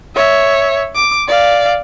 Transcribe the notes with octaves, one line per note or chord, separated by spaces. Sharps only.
C#5 E5
D6
D5 F5